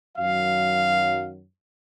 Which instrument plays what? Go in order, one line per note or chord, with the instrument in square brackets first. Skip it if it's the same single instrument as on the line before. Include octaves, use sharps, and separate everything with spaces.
[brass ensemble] F#2 D#3 F#3 F5